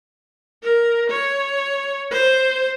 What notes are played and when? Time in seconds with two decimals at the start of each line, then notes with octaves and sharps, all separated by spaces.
0.63 A#4
1.10 C#5
2.11 C5